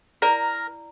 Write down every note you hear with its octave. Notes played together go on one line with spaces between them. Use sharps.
E4 A#4 D5 A#5